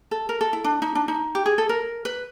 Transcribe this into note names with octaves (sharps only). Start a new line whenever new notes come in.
A4
A#4
A4
E4
D4
D#4
D4
D#4
G4
G#4
A4
A#4
B4